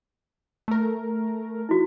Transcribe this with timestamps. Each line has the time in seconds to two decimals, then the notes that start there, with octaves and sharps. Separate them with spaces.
0.68 A3 A#4
1.69 E4 F#4